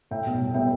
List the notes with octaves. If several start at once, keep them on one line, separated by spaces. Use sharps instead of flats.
A2 E5 G5
B1
G3
B3 E5 G5